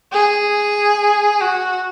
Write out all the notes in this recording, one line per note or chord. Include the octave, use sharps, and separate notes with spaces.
G#4
F#4